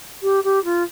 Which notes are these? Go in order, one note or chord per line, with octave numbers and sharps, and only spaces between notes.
G4
G4
F4